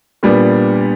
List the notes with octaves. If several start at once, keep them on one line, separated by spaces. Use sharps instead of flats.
A#2 G3 B3 D4